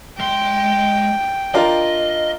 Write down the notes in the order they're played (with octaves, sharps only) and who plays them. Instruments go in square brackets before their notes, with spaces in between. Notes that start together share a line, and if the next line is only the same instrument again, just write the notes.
[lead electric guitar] G#3 C6 [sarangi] G5
[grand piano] D4 F4 A#4 [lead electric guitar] D#5